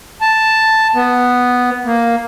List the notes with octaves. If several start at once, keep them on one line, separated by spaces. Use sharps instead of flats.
A5
B3
A#3